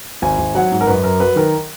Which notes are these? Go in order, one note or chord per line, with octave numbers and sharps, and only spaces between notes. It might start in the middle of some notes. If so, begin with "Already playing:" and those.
G#1 G#5
G#1
F#3 F#5
G#2
A#4
F#2 B4
F#2 A#4
F#3 B4
D#3 A#4